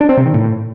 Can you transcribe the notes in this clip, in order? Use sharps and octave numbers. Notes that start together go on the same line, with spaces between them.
D4
C4
C3
D#3
A2